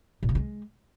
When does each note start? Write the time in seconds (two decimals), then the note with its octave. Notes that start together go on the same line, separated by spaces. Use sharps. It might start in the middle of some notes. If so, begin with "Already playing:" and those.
0.23 A#2
0.29 C#3
0.35 G#3